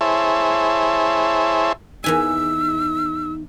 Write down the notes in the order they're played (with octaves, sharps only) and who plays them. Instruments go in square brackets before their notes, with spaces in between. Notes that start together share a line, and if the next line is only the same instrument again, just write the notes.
[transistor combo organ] E4 G#4 C5 C#5 E5 A5
[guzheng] E2 E3 G#5 [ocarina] D#4 [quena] E6